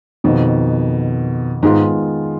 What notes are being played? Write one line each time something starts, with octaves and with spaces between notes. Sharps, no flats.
F2 B2 D#3 B3
G#2 D#3 G#3 B3 F4